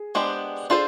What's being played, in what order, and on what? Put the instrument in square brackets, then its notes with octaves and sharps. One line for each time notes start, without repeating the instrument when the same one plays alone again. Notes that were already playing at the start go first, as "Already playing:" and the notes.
Already playing: [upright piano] G#4
[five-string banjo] G#3 B3 D4 G4 C5
[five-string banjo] D4 F4 A4 C5 [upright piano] G#4